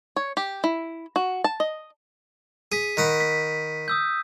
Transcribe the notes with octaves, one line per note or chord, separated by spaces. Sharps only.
C#5
G4
E4
F#4
A5
D#5
G#4 B6 D#7
D#3 F#5 B5
B6
D#6 E6 G6